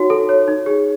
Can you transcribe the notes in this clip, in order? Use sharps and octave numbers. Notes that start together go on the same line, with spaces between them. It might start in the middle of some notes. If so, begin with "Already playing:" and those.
Already playing: D#4 F#4 C#5
A4
C#5
D#4
G#4